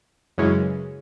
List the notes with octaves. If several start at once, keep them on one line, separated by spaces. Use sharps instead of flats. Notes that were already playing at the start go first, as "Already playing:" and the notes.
F#2 C#3 E3 G#3 C#4